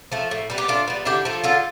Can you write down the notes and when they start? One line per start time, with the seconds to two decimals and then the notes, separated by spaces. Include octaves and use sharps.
0.12 F3 A3
0.31 A2
0.50 G3 B3
0.58 G4
0.68 A2 D4 F4
0.88 G3 B3
1.05 D3 E4 G4
1.25 F3 A3
1.44 D3 F4 A4